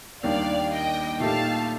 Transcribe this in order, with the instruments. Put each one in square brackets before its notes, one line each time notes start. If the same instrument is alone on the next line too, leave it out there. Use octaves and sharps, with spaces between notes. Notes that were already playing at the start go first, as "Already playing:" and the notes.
[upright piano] D#2 D#3 G3 D4 [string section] D5 F5
[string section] D#5 G5
[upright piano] A#2 A3 D#4 G4 [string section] F5 A5